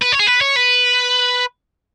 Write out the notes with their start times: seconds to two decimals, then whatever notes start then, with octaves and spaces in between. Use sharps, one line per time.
0.02 B4
0.12 C#5
0.19 G#4
0.27 B4
0.41 C#5
0.56 B4